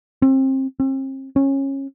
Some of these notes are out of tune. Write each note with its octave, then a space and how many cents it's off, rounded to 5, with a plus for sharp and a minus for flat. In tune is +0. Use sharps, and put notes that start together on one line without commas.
C4 +30
C4 +40
C#4 -20